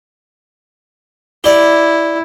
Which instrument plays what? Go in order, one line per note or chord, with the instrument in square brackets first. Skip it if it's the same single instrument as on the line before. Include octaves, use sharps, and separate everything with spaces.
[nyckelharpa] E4 [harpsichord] G4 D5